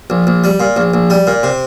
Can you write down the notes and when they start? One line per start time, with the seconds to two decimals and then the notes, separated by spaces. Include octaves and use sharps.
0.10 A#1
0.27 A#1
0.44 G3
0.60 A#2
0.76 A#1
0.94 A#1
1.10 G3
1.27 A#2
1.43 C3